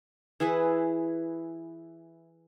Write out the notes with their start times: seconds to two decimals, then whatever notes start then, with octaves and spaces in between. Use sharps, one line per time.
0.40 E3 E4 G#4 B4